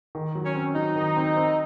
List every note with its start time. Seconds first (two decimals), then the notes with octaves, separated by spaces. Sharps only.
0.15 D#3
0.35 F#3
0.45 C#4
0.55 C4
0.75 F#3 D#4
0.96 D#3
1.16 C4
1.37 C4